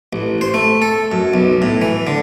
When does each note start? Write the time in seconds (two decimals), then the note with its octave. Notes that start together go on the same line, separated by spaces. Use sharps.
0.13 A1
0.41 C5
0.54 A3
0.82 A4
1.12 F#2
1.34 B1
1.62 A2
1.82 E3
2.07 D3